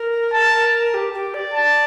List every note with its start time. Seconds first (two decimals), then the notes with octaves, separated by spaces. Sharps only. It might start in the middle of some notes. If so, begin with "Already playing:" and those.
Already playing: A#4
0.33 A5
0.94 G4
1.13 G4
1.34 D5
1.54 A5